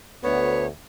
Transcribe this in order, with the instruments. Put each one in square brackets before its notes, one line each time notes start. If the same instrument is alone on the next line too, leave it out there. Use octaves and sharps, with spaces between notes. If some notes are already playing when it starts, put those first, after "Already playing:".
[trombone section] D2 [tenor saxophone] B3 [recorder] C#5